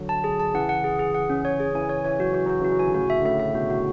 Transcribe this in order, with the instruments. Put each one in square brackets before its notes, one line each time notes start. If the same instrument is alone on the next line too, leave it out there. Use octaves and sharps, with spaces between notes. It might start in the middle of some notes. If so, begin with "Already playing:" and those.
Already playing: [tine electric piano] D3 F#3
[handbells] A5
G#4
A5
[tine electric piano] C#3 E3 [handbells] F#5
[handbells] F#5
G#4
G#4
F#5
C#4
C#5
G#4
[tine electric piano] C#3 E3 [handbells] G#5
[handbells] C#5
[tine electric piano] E3 [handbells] C#5
[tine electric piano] F#3 [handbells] F#4
[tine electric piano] E3 [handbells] F#4
[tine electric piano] F#3 [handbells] F#4
[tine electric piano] C#3 E3 [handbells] F#4
[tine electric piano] F#3
[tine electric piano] E3 [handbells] G#5
[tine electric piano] D3
[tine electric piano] A2 C#3 [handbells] F#4
[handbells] E5
[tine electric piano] D3
[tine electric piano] A2 C#3 [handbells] E5
[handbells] E5
[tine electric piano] B2 D3 [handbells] F#4
[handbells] F#4